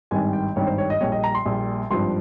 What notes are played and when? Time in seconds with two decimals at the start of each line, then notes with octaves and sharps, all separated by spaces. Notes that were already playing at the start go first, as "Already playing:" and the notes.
0.11 G#1 G2 D#3 G3 G#5
0.33 G5
0.56 G#1 G2 D#3 G3 C#5
0.67 C5
0.78 C#5
0.90 D#5
1.01 A#1 A#2 G3 C#5
1.12 D#5
1.24 A#5
1.35 C6
1.46 A#1 A#2 G3
1.90 G#1 G2 F3 C6